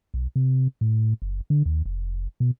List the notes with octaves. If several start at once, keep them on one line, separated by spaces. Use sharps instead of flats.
B1
C3
A2
F#1
D3
D#2
F1
B2